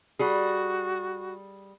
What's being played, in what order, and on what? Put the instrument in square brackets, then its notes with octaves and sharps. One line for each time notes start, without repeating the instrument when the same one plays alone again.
[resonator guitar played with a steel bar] G3 G#4 [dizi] F#4